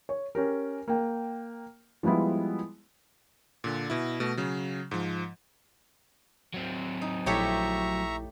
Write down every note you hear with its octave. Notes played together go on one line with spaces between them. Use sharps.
C#5
C#4 G4 A#4
A#3 G5
F3 G3 G#3 B3 E4
A#2 D3
B2 E4
B2 A3
C#3 F#3
G#2 F3
F#3 C4
D#4
A#1 A3 E4 G4 C#5 E5 A#5 C#6